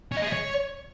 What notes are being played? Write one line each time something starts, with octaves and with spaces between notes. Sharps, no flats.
C#4
D#5
G#4
E5
C#5